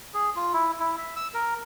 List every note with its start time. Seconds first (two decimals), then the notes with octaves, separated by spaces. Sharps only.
0.14 G#4
0.36 F4
0.53 E4
0.80 E4
0.98 E5
1.16 E6
1.34 A#4